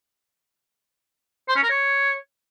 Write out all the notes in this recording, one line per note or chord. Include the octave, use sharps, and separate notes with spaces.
C5
C#4
A#4
C#5